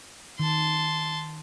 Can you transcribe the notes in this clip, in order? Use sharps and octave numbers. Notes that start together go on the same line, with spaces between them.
D#3 A5 C6